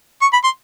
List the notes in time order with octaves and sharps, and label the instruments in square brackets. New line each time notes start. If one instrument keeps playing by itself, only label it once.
[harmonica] C#6
B5
C6